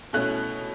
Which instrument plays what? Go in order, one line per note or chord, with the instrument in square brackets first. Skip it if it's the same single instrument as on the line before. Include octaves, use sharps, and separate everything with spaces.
[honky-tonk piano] B2 A3 C#4 E4 F#6